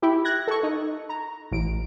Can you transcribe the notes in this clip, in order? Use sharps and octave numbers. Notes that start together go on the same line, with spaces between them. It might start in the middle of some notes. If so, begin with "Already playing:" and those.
E4 G4
F#6 G#6 A#6
A4 C#6
D#4
A#5
A1 D7